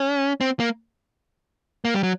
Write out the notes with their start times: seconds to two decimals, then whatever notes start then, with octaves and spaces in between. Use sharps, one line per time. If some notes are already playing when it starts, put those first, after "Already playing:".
Already playing: C#4
0.41 C4
0.60 A#3
1.85 A#3
1.94 G3
2.03 F#3